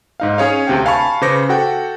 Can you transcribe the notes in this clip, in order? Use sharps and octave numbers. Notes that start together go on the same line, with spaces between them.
G#2 D#4 F5
C#4 G#4 C#5 F5
D2 C3 G5
F5 G#5 A5 B5 C#6
C#3 B4 C5 D6 A#6 C#7
F#4 A4 F#5 G5